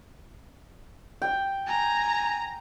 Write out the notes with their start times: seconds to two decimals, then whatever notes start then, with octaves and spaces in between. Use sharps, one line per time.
1.22 G5
1.67 G#5 A#5